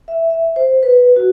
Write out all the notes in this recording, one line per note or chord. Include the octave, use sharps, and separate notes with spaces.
E5
E5
C5
B4
F#4